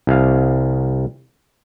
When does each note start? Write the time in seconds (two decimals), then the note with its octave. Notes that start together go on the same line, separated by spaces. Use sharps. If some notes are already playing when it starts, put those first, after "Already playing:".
0.07 C2 F5